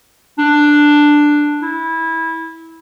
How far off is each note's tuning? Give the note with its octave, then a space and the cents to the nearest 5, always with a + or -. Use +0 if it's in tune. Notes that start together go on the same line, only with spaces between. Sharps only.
D4 +5
E4 -15